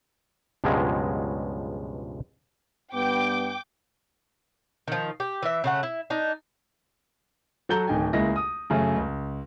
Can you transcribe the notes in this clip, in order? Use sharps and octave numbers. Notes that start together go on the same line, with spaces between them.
C#2 G2 B2 F3 F#3 G#3
G2 B3 G5 D6
D#3 F3
G4
E3 E5
C#3 A3 F#5
E4
D4 D#4
F#3 F#4 A4 A#5 G6 G7
D1 D#3 G5 G#5
C#2 G#3 A#3 E4 A#6
D#6
F#2 C#3 A3 C#4
C#2